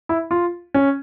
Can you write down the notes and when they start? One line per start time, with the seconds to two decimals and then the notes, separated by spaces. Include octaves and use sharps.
0.09 E4
0.31 F4
0.74 C#4